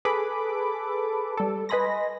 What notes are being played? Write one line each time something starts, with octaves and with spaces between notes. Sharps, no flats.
G#4 A4 B4 B5 D6
G3 A4
B4 D#5 G#5 B5 C6 A#6